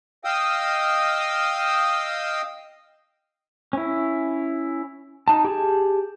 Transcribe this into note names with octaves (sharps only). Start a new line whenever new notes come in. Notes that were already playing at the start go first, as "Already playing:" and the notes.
D#5 F5 G5 D#6 E6
C#4 E4
D#4 A5
G4 G#4 A5